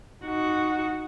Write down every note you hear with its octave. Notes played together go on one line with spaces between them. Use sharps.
D#4 F#4